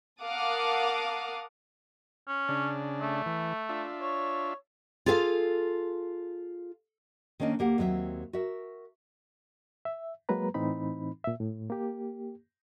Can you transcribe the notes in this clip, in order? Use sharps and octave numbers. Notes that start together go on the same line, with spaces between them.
A#4 F5 F#5 A5 D6 D#6
C#4
C#3 D4
A3
E3
D4 F4 E5
C#5
F4 G#4 A4 E5 F5
D#3 A#3 C#4 D4 D#5
D2 A#3 G4 F#5
D#2 F#3 C4 F#4 E5
F#4 A#4 E5
E5
F#3 G#3 A#3 B4 A#5
A2 E3 C4 D#4 B5
A#2 E5
A2
A#3 G4